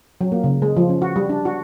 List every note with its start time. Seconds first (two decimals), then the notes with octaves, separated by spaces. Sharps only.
0.21 F#3
0.32 A#3
0.44 C#3
0.62 G#3
0.77 F3
0.89 C#4
1.02 F#4
1.16 G3
1.29 D4
1.45 F#4